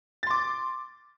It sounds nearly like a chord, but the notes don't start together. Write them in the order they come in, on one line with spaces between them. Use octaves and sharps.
A6 C6 D6